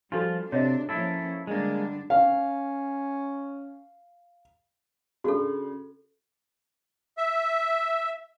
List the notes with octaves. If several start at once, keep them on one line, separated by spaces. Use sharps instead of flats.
F3 G3 D4 F4 F#4 A4
C3 D4 C#5 D#5 E5
F3 A#3 C#4 E4 A4
D3 G3 G#3 A#3 D4
C#4 F5
C#3 D4 F#4 G#4 A4
E5